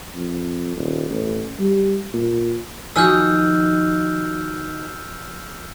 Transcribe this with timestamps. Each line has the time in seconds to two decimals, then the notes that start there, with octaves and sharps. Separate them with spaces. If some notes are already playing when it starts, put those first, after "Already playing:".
0.15 F2
0.77 D#1
1.09 A1
1.59 G3
2.13 A#2
2.96 D#3 F3 D#4 F#4 G#5 E6 F6 G6